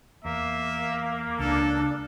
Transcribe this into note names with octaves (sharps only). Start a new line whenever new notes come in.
E2 A#3 E5
C#2 D4 A4